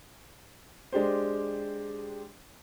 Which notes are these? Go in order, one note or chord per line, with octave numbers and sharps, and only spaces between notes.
G#3 D4 G4 C5